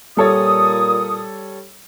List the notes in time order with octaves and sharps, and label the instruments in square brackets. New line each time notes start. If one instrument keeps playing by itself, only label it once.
[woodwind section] A#2 D#6 [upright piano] G3 A4 C#5